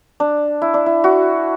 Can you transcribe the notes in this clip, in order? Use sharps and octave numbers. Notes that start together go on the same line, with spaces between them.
D4
E4
D4
E4
F#4